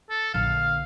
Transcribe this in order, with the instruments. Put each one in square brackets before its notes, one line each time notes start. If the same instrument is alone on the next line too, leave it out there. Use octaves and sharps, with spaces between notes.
[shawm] A4
[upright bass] A#1 D3 [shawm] F5